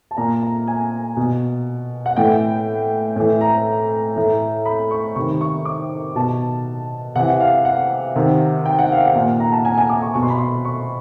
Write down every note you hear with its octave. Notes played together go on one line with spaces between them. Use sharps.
A5
A#2 A#5
A#5
G#5
B2
F#5
A2 E3 G5
A2 E3
A#5
A2 E3
B5
C#6
C3 D#3 C#6
C#6
D6
B2 A5
C3 E3 F#5
F#5
F5
F#5
C3 D#3
G5
F#5
F5
F#5
A#2
A#5
A5
G#5
G#5
D6
C#6
B2 C#6
C6
B5
C6
C#6